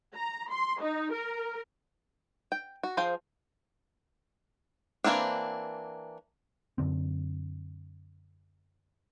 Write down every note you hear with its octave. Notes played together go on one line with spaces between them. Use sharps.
A#5
C6
D#4
A#4
G5
F#4
F3 G#4 C5 F5 G5
E3 G#3 A#3 C4 D4
F#2 D3 C4